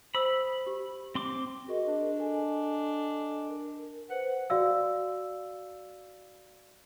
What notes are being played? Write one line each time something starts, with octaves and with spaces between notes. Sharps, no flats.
C5 B5 D#6 E6
G4
C4 C6 D6
F#4 G#4 A#4 D#5
D4
A4 D#5 G#5
A#4
B4 C5 F#5
F#4 D5 F5 E6